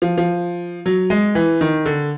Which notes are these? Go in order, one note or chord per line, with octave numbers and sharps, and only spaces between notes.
F3
F3
F#3
G#3
E3
D#3
D3